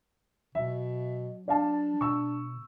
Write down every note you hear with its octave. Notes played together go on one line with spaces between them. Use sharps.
B2 F#3 E5
D4 D5 F5 A5
B2 C#6 E6